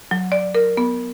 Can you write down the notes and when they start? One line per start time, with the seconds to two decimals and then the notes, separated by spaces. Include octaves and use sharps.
0.11 F#3
0.32 D5
0.55 A#4
0.77 B3